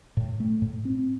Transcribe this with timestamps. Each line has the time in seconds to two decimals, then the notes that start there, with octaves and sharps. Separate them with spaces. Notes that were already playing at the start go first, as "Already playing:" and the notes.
0.17 A2
0.40 A3
0.62 A2
0.85 C4